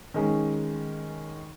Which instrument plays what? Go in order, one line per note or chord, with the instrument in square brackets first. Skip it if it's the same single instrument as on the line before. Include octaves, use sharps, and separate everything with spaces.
[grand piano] D#3 G#3 C#4